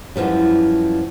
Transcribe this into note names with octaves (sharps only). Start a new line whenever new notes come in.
F#2 E3 F3 G3